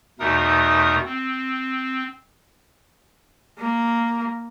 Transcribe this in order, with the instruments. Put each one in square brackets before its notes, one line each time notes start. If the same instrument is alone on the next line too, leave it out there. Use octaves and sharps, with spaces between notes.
[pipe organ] E2 B2 A3 D#4 A#4 D#6
C4
[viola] A#3